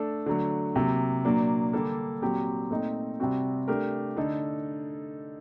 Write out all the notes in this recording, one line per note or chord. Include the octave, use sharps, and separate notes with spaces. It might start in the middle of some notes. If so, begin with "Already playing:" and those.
Already playing: A3 D4 A4
D3 F#3 A3
C3 F#3 A#3
A#2 F#3 A#3 D4
D3 G3 A#3 D4 A4
A#2 F#3 C4 G4
A#2 A3 C4 D#4
C3 G3 C4 F#4
A3 D4 G4 A#4
D3 A3 D#4 A4